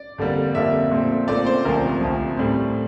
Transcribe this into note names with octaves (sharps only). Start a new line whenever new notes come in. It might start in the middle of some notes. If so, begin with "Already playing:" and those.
Already playing: D5
F2 D3 G3 A#3
F2 D3 G3 A#3 E5
A#2 A3 C4
A#2 A3 C4 D5
C5
D2 C3 F3 A#4
D2 C3 F3
A2 G3 C4